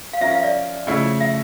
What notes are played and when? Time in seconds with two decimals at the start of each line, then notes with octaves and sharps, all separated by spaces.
0.13 F5
0.20 F3 C#4 F4 A#4 E5
0.32 F5
0.39 E5
0.44 D5
0.87 C#3 F3 A3 E4
1.20 E5